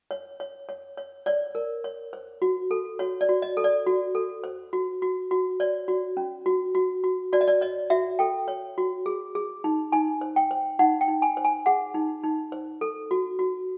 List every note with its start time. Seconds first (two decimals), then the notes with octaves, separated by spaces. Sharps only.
0.11 C#5
0.40 C#5
0.69 C#5
0.98 C#5
1.26 C#5 D5
1.55 A#4
1.84 C#5
2.13 C5
2.42 F#4
2.71 A4
2.99 F#4 C#5
3.21 D5
3.29 F#4
3.42 D#5
3.57 A4
3.64 D5
3.86 F#4
4.15 A4
4.44 C5
4.73 F#4
5.02 F#4
5.31 F#4
5.60 C#5 D5
5.88 F#4
6.17 C#4
6.46 F#4
6.75 F#4
7.04 F#4
7.33 F#4 D5
7.41 D#5
7.48 D5
7.61 C#5 D#5
7.90 F#4 E5
8.19 A4 G5
8.48 C#5
8.78 F#4
9.06 G#4
9.35 G#4
9.64 D#4
9.92 D#4 G#5
10.21 C5
10.36 G5
10.51 C5
10.79 D#4 F#5
11.01 G5
11.08 D#4
11.22 G#5
11.37 C5
11.45 G#5
11.66 G#4 F#5
11.94 D#4
12.23 D#4
12.52 C5
12.81 A4
13.11 F#4
13.39 F#4